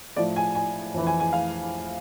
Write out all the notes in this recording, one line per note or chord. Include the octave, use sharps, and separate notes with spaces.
A2 F3 D5
G#5
G#5
F2 E3
G#5
G#5
F5